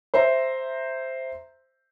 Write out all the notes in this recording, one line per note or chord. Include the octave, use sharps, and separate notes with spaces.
C5 E5 A#5